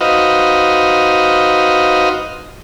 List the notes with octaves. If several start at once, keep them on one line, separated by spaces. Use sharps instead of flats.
D#4 F#4 B4 C5 D#5 F5